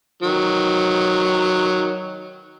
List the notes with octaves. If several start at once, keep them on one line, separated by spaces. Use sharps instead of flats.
D#3 F#3